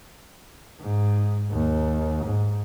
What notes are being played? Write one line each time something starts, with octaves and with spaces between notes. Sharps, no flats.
G#2
D#2
G#2